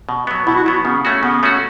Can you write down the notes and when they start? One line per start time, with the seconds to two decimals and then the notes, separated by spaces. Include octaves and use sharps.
0.09 B2
0.27 F#3 B3
0.47 B2 E4
0.56 F#4
0.64 F#3 B3 E4
0.85 C#3 B3
1.05 A3 C#4 F#4
1.23 C#3 B3
1.43 A3 C#4 F#4